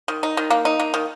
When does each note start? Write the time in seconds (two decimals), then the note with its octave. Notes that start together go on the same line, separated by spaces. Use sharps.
0.08 D#3
0.23 D#4
0.37 D#3
0.50 A#3
0.65 D#4
0.79 A#3
0.94 D#3